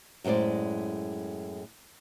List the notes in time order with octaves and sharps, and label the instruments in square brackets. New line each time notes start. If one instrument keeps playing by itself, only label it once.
[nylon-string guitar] F#2 A2 G#3 C5 D5